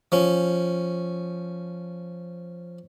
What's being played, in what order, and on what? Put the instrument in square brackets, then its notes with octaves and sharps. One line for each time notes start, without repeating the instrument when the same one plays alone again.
[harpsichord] F3 C#4